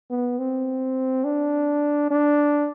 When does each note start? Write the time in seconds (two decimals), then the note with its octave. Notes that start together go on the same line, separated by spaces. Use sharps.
0.11 B3
0.39 C4
1.24 D4
2.11 D4